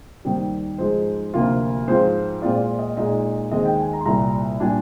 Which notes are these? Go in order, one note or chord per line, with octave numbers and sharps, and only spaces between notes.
D#2 D#3 G3 C4
G#2 F3 G#3 D#4 C5
D2 C3 F3 A#3 F4
G#2 F3 C4 F4 C5
A#2 G#3 C4 F4 D5
D#5
A#2 G#3 D#4 D#5
D#2 D#3 G#3 C4 D#5
G5
G#5
A#5
C6
C2 A#2 G3 A#5
A#2 G3 D4 G#5